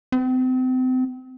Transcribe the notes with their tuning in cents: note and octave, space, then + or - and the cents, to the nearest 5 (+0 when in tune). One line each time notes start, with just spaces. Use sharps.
C4 -35